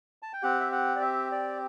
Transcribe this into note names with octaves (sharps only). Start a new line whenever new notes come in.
A5
G5
C4 G4 F#5
E5
F#5
D5
E5
D5